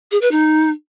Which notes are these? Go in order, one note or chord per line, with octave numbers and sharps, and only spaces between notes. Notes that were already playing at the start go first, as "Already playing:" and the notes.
G#4
B4
D#4